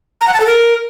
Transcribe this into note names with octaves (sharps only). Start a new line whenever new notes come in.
A#5
F#5
A5
A4
A#4